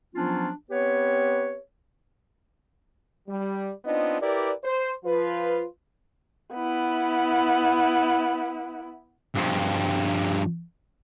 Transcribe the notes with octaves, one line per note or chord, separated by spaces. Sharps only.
F3 F#3 B3 C#4 D4 F4
B3 C4 G4 B4 C#5
G3
B3 C4 D4 D#4 F4 D#5
E4 G4 A#4 B4 D5
C5
F3 F4 B4
B3 E4
G2 F3